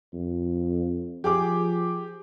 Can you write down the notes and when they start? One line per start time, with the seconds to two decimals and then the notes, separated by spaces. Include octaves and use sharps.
0.13 F2
1.24 F3 G4 G#4 D6